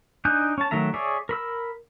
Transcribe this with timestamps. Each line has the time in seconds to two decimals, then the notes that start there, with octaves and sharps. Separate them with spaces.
0.25 D4 D#4 G#5 F#6 G6
0.58 C#4 A5
0.71 D#3 F#3 A3 E5 A#5
0.94 G#4 C#5 D5 E5
1.29 A#4 B5 E6